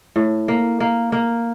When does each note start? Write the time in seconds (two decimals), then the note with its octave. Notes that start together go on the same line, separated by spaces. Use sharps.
0.16 A2
0.48 A#3
0.80 A#3
1.12 A#3